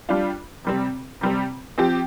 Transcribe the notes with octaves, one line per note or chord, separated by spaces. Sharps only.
G3 D4 F4
C3 G3 C4
C3 G3 C4
F3 C4 G4